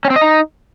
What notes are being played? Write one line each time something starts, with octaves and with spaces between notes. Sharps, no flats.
C#4
C4
D#5
D#4